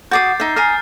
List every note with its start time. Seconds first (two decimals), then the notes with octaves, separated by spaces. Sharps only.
0.11 F#4 D6 D#6 G6 A6 C7
0.40 D#4 E5 G6
0.56 G#5 A#5 D#6 F6 C7